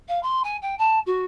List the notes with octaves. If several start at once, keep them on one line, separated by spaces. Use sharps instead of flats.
F5
C6
G#5
G5
A5
F#4